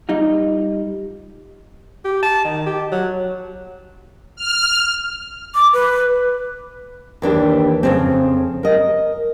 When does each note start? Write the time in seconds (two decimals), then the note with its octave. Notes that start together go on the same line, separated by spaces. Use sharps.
0.09 G3 D#4 F4
2.05 G4
2.23 A5
2.44 D#3
2.66 G4
2.92 F#3
4.36 F6
5.55 D6
5.73 B4
7.22 D#2 E3 D4 G4
7.83 F2 C#3 C4
8.63 A#4 D#5